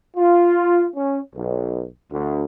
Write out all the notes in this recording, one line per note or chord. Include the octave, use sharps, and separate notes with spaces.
F4
C#4
B1
D2